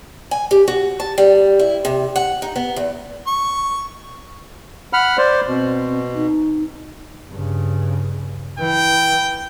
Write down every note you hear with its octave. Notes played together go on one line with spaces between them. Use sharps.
G#5
G4
F#4
A5
G3
E4
C3
F#5
D#4
B3
E2
C#6
F#5 B5 F6
C5 D5
B2 C4
D#4
G2 C#3
E3 G5